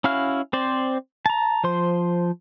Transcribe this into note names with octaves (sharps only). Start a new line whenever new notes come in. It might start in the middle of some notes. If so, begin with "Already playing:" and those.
C#4 E4 F#4 F5 F6
C4 C5 D5
A5 A#5
F3 C5 C6